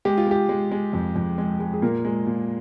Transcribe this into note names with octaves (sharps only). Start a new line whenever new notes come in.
G#3 G4
F4
G#3 G4
G#3
G#3
F2
F2
G#3
G#3
G#4
A#2 A#3 A#4
G#3
A#2